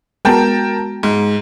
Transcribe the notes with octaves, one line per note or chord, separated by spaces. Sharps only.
G#3 B3 F#4 A#4 G5 A5
G#2